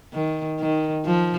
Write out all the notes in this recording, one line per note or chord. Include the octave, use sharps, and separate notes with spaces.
D#3
D#3
F3